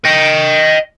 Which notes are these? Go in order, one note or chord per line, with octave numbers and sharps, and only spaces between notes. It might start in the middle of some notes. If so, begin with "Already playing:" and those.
D#5 G5